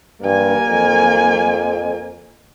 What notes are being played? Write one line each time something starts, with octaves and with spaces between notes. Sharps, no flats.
G2 A#3 G#5
F2